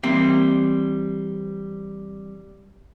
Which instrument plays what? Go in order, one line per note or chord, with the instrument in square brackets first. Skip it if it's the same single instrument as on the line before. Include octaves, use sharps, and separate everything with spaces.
[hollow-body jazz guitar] E3 G3 A#3 C4